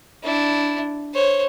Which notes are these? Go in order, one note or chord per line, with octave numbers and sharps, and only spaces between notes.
D4 E4
C5 C#5